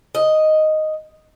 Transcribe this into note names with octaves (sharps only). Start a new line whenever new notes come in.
D#5